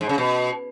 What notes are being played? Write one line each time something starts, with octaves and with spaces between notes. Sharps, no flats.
G#2
C#3
B2